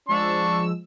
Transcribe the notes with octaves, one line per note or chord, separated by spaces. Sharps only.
F3 G#3 D4 C#6 E6